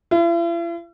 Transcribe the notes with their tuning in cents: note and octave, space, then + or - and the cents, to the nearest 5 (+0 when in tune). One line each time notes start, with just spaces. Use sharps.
E4 +45